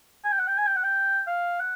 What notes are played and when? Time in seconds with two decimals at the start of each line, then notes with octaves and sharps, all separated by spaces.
0.24 G#5
0.32 G5
0.38 F#5
0.47 G5
0.58 G#5
0.67 G5
0.75 F#5
0.83 G5
1.27 F5
1.60 F#5